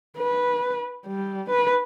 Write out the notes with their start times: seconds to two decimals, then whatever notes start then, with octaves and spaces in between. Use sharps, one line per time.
0.18 B4
1.07 G3
1.50 B4